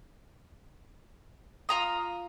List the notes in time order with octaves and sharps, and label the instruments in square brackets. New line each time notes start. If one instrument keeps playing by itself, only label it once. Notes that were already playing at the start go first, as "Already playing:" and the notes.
[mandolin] F4 A#5 D#6